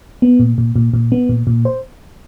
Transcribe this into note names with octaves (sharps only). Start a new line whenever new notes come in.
B3
A#2
A#2
A#2
A#2
B3
A#2
A#2
C5